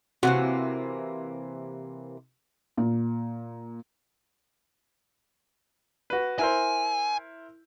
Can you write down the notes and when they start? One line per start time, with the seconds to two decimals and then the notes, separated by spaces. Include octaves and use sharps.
0.23 C3 E3 A#3 F#4 F#5
2.77 A#2
6.10 F#4 B4
6.39 E4 A#4 C5 G#5